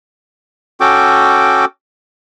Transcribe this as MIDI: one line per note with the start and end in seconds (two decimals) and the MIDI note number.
0.80 1.65 61
0.80 1.65 66
0.80 1.65 69
0.80 1.65 79
0.80 1.65 86